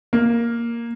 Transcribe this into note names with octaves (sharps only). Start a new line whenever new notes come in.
A#3